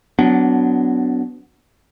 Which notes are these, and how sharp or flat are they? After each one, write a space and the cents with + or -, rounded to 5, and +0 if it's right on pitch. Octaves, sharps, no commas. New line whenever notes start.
F#3 +0 B3 +20 D4 -15